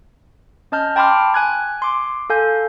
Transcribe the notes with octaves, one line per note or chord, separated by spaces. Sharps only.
C#4 D#5 A5 F6 G6
G5 A5 B5 C6 D6 F6
G#5 F#6 G#6
C6 D6
A4 F5 G#5 G6